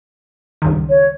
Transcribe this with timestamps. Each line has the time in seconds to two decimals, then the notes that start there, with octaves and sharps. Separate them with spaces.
0.62 C#2 G2 D#3
0.89 C#5